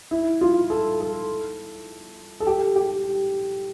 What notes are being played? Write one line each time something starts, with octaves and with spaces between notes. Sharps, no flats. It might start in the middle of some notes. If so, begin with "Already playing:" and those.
E4
F4
A4
A4
A4
G4
G4